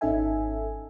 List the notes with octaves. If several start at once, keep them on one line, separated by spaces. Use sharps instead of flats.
G#1 C#4 D#4 A4 E5 G#5